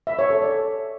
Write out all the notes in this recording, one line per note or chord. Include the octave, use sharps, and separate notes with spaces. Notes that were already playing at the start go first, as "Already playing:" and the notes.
E5
C#5
A4
D5